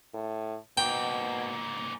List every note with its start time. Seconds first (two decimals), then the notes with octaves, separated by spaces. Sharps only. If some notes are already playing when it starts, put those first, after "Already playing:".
0.14 A2
0.77 G#2 B2 A#3 G5